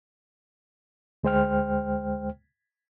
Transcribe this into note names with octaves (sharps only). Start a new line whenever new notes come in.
D2 G#3 C5 G5 F6